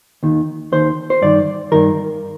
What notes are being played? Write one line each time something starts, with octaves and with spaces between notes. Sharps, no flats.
D#2 D#3
D#2 D#3 C5
C5
G2 D#3 D5
G2 D#3 A#4